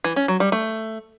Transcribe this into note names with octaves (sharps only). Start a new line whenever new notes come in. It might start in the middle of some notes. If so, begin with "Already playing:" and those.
E3
C#4
F#3
G3
A3